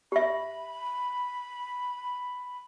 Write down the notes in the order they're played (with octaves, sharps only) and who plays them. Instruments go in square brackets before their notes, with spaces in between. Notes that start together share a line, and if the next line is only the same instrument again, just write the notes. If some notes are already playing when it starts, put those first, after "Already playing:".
[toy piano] G4 E5 [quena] B5